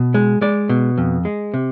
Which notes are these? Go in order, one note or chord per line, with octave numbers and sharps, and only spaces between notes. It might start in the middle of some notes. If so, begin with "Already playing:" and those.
Already playing: B2
G#3
G#3 D5
B2
F2
G#3
C3